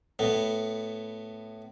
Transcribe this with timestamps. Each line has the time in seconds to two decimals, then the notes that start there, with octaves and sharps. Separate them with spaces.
0.19 A2 B3